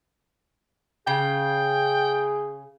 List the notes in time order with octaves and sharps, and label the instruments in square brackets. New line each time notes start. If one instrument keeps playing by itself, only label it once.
[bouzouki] C#3 [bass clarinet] G#4 [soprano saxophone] G5